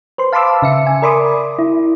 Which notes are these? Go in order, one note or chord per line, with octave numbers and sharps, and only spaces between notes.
B4 C5 C6
F5 A5 B5 C6 D6 E6
C#3 E5 C#7
G#5
A#4 D5 B5 C6 D6 D#6
E4